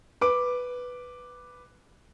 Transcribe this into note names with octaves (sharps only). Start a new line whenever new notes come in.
B4 D6 D7